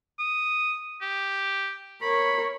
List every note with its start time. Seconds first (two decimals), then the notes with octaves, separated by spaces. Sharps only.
0.19 D#6
1.02 G4
2.02 A#4 C#5 B5